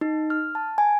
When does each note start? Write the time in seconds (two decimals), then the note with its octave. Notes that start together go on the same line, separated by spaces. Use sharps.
0.01 D#4
0.30 F6
0.55 A5
0.78 G#5